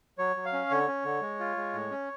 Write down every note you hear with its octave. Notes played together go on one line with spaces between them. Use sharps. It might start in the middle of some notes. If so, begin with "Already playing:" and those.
F#3 C#5
F#3
F5
C#4
D3 C#5
C#4
D3
G#3
F4
G#3
A2
C#4